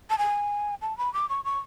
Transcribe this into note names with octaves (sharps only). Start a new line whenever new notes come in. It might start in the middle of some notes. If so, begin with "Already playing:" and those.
A5
G#5
A5
B5
D6
C#6
C#6